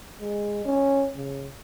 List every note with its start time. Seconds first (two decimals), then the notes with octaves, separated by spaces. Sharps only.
0.21 G#3
0.66 C#4
1.16 C#3